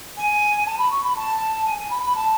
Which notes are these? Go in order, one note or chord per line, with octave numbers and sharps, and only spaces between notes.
G#5
A5
B5
C#6
B5
A5
G#5
G#5
B5
B5
A5